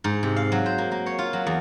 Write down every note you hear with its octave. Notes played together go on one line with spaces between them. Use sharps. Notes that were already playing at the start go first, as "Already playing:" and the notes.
G#2
C3
F5
F#3
C5
A#3
A#3
C#5
F4
F#3
E2